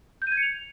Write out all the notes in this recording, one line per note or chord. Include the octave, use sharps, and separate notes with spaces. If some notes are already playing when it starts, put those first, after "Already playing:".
G6
D#7
G#6
C#7
F7